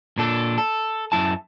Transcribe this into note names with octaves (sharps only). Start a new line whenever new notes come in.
A#2 D4 A4
A4
F#2 G#3 E4 A5